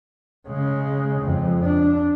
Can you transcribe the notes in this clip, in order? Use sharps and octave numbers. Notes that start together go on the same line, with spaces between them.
C#3 G#3
F2
D4